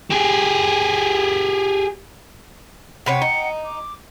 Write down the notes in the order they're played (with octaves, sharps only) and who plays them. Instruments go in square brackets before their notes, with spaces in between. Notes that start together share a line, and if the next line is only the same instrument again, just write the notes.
[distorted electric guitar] G4 G#4
[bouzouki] C3 B4 C#5 [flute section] F#5 G5
[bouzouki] D#4
[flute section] D6